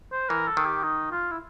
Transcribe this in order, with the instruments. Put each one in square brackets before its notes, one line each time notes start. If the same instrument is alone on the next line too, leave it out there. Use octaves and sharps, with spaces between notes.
[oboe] C5
[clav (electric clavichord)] E3 [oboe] A#4
[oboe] A4
[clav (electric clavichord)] D#3
[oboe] G4
D#4
F4
E4